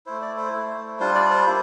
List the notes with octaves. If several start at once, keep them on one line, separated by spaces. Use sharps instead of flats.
A3 E4 C5
D5
C5
A3 E4
G3 D4 F4 C5
D5
C5
G3 A#3 E4